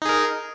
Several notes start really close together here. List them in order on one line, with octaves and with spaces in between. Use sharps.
D#4 G#4 A#4